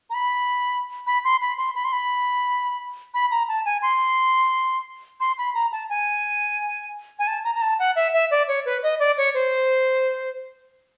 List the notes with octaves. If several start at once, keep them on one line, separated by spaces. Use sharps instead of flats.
A#5
B5
B5
C6
B5
C6
B5
C6
B5
B5
A#5
A5
G#5
C6
C6
B5
A#5
A5
G#5
G#5
A5
A#5
A#5
A5
F#5
E5
E5
D5
C#5
B4
D#5
D5
C#5
C5